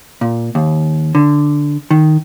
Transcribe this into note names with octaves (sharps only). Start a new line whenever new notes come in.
A#2
D#2
D3
D#3